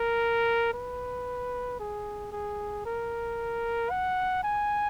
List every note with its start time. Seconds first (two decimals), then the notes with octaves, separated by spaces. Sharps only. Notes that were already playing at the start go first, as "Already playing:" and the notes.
Already playing: A#4
0.73 B4
1.79 G#4
2.32 G#4
2.85 A#4
3.91 F#5
4.43 G#5